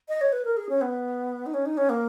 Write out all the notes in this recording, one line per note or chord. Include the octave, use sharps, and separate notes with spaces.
D#5
C#5
B4
A#4
G#4
C#4
B3
D#4
C#4
D#4
C#4
A#3